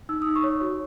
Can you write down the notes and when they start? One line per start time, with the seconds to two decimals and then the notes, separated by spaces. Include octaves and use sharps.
0.09 D#4 E6
0.22 D#4 D#6
0.36 C#6
0.44 C#5
0.61 F#4